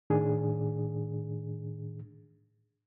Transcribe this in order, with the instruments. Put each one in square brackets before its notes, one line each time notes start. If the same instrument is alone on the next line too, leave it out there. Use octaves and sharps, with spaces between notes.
[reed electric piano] A2 D#3 D4 G#4